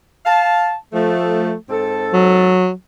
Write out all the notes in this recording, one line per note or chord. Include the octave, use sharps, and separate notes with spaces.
F5 A5
F3 A3
G#2 C4 A4
F#3